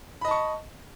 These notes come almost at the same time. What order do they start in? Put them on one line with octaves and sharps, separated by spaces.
B5 D#5 A5 C#6